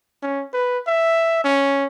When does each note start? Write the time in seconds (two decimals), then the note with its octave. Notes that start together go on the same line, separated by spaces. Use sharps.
0.22 C#4
0.54 B4
0.87 E5
1.44 C#4